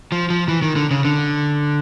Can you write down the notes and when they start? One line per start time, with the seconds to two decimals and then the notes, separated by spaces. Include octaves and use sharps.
0.12 F3
0.30 F3
0.48 E3
0.62 D#3
0.76 D3
0.91 C#3
1.05 D3